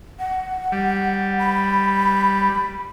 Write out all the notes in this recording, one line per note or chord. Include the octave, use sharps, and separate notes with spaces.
F#5
G3
B5